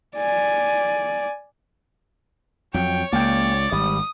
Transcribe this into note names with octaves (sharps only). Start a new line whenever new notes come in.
D5 G#5
F2 F#3 C#5 G5
C#2 A#3 D5 G5
G#1 G3 D#6